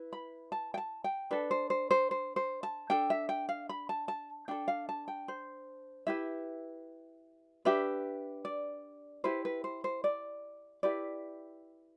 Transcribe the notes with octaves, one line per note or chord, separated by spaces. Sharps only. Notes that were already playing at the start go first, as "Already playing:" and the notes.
Already playing: E4 B4
B5
A5
G5
A5
G5
D4 A4 B4
C5
C5
C5
C5
C5
A5
D4 A4 G5
E5
G5
F5
B5
A5
A5
D4 A4 G5
F5
A5
G5
C5
E4 G4 B4 E5
D4 G4 B4 E5
D5
E4 G4 B4 C5
B4
C5
C5
D5
E4 G4 B4 D5